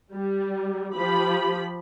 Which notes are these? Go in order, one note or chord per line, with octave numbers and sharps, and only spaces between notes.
G3
F3 G4 B5